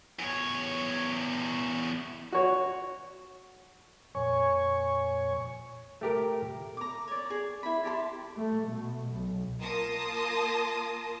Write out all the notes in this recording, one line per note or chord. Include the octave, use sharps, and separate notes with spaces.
E2 C#5
F#4 C#5
F2 A#2 C#5 G#5 C#6
A3 G4 A#4
A#5 D6
C#5 D5
G#4
E4 B5
G4 A5 B5 C6
A3
B2
B1
A#3 F4 A5 C6 D#6 A#6